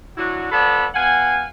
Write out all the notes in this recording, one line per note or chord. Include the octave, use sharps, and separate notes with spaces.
F#3 D4 E4 F#4
F3 B3 A4 D5 A5 B5
B2 F5 F#5 G#5